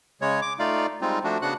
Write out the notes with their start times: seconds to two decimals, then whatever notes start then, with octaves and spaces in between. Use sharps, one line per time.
0.21 C#3 G#3 C#5
0.42 D6
0.59 A3 D#4 F4 D5 F5
1.01 G3 G#3 C4 D#4 F4
1.24 F3 A3 D4 F#4
1.42 C#3 B3 D4 F#4 F#5 F#6